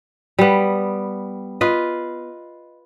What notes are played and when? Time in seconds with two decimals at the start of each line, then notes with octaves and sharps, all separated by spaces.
0.39 G3 B3
1.61 F4 B4 D#5